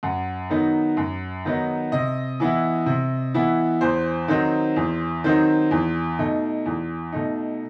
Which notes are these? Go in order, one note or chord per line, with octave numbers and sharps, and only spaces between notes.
F#2 F#5
D#3 F#3 B3 D#4
F#2
D#3 F#3 B3 D#4
C3 D#5
E3 B3 E4
C3
E3 B3 E4
E2 C5
D#3 F#3 C4 D#4
E2
D#3 F#3 C4 D#4
E2
B2 A3 D#4
E2
B2 A3 D#4